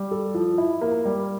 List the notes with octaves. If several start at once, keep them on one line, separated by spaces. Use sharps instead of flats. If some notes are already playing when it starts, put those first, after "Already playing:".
Already playing: G3
A4
F3
E4
A#3
G3